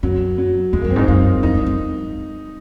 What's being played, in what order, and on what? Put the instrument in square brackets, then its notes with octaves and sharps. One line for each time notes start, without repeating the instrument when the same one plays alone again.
[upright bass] F#2 [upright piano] F#3
[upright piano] F#3
[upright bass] F2 [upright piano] G#3
[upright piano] A#3
[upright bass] F#2
[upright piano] C4
[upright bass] G#2 [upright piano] D#4
[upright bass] F#2 [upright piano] F4
[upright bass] F2 [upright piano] D#4
[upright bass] F#2
F2